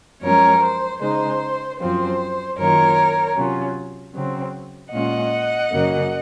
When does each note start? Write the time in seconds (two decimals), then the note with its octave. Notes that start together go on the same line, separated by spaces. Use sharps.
0.22 F#2 F3 G#3 C#4 A#4 C#5
0.62 C5
1.01 C#3 G#3 D#4 C5
1.79 F#2 F3 C4 C5
2.58 F#2 D#3 A#3 F4 A#4 C#5
3.36 C3 F#3 C#4 F4
4.15 C#3 F#3 C4
4.92 A#2 G#3 C#4 F4 D#5 F#5
5.72 F#2 C#3 F#3 A#3